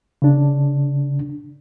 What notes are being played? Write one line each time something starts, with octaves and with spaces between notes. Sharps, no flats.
C#3 D4